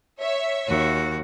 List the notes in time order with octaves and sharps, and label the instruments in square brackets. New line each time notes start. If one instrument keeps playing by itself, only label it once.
[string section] C#5 E5
[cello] D#2 F#4